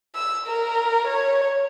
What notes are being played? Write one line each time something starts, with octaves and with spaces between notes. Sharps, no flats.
E6
A#4
C#5